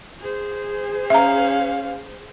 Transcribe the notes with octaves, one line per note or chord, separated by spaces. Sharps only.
G#4 C5
C#4 E5 F5 A#5